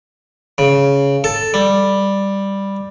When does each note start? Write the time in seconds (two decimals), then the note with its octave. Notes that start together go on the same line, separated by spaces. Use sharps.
0.58 C#3
1.24 A4
1.54 G3